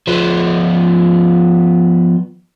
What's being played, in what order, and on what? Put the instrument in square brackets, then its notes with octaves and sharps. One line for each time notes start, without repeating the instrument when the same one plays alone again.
[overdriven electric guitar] F3 B3